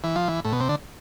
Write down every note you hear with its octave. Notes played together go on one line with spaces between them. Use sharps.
E3
F3
E3
A2
B2
C3
D3